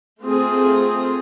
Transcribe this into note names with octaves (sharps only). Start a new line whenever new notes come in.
A3 C4 F4 G#4